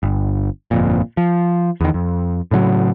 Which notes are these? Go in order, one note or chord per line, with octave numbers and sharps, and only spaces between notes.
G1
G1 F2 A#2
F3
E2 D#3
F2
A2 C#3 E3 F#3